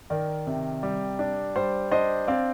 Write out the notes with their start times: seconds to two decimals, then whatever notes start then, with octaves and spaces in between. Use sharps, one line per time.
0.10 D#3 A#4 D5
0.47 C3
0.83 G3
1.19 D4
1.56 G3 C5
1.91 D4 C5 D#5
2.27 C4 D5 F5